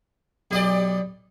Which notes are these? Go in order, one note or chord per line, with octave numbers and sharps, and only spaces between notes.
B1 G4 D5 D#5 C6